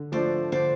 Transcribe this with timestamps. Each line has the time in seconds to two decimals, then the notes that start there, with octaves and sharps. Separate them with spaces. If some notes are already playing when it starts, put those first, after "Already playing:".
Already playing: D3
0.12 F3 A3 D4 C5 D5
0.52 D3 C5 D5